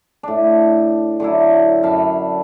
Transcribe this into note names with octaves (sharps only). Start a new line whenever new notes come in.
A2 D4
D3 F#3 D4 E4
F#2 F5 A5 B5